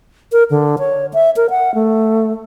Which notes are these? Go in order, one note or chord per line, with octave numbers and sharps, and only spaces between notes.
A#4
D3
C#5
E5
A#4
F#5
A3